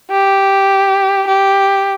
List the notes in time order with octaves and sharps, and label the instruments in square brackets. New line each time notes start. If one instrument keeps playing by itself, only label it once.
[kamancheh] G4
G4